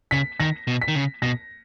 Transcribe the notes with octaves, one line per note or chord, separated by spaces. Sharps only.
C#3 B6
D#3 A#6
B2
B6
D#3
C#3
B2 A#6